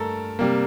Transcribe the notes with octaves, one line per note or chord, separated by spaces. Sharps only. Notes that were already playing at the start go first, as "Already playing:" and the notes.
Already playing: G2 A3 A4 A#4
C3 G3 A#3